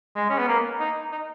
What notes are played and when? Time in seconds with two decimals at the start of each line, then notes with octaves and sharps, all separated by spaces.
0.16 G#3
0.30 C#4
0.38 B3
0.48 A#3
0.80 D#4
1.12 D#4